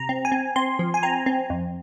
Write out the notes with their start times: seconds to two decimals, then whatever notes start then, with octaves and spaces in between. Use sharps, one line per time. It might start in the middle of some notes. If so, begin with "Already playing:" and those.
Already playing: C3 A#5
0.09 C4
0.25 G#5
0.32 C4
0.56 C4 C6
0.79 F3
0.94 G#5
1.03 C4 A#5
1.26 C4
1.50 F2